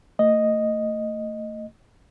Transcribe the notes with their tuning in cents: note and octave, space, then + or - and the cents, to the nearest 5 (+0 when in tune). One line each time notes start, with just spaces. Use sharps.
A3 +35 D#5 +0